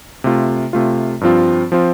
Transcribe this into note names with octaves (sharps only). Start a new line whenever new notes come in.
C3 A3 F4
C3 A3 F4
G2 F3 C4 F4
F3 C4 F4